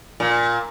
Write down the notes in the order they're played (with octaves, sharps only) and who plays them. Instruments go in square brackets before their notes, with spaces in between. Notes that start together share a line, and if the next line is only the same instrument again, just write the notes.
[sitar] A#2